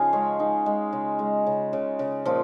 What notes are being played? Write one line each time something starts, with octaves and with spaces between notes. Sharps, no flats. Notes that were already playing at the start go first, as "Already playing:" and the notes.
Already playing: C#3 F3 D#4 F4 G#4 F5 G#5
G#3 C#4 C#5
G#3 D#4
G#3
C#3
G#3
C#3
C#3
C#3
A#2 F3 F4